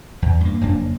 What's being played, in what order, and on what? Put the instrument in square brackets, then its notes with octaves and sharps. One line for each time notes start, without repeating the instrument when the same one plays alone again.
[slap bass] E2
G2 A#3
F#1 F2 A#3 D4